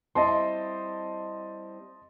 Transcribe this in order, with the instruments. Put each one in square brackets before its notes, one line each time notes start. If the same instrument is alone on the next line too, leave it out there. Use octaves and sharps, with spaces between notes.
[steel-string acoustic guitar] G3 C4 E4 [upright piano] D#5 A5 C6